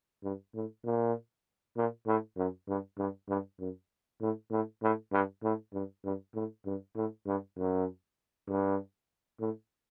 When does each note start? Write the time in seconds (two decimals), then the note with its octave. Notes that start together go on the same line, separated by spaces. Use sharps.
0.24 G2
0.55 A2
0.85 A#2
1.77 A#2
2.07 A2
2.37 F#2
2.68 G2
2.98 G2
3.29 G2
3.60 F#2
4.21 A2
4.51 A2
4.83 A2
5.12 G2
5.43 A2
5.73 G2
6.04 G2
6.35 A2
6.66 G2
6.96 A2
7.27 G2
7.57 F#2
8.49 G2
9.40 A2